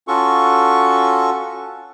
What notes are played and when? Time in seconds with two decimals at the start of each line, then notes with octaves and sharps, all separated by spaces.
0.08 C#4 F4 F#4 A4 C#6